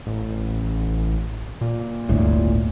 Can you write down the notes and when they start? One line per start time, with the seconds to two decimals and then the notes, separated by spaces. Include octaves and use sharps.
0.06 A1
1.61 A#2
2.09 G1 D2 A2